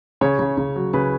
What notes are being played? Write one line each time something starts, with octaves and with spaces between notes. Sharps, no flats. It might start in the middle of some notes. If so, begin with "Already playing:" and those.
C#3 C#5
C#3
C#3
F#3
C#3 B4